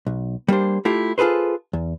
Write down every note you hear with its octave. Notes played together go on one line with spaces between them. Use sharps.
B1
G3 A#3 D4 C5
A3 E4 F4 G4
F4 G#4 A4 B4 C5
E2